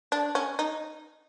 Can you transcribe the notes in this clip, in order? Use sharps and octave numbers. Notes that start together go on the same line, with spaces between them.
D4
C#4
D#4